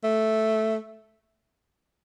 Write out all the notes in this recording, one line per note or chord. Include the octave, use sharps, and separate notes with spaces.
A3